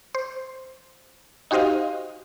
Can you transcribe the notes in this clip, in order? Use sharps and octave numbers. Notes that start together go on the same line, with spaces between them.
C5
D#4 F#4 G4 C5 D#5 F5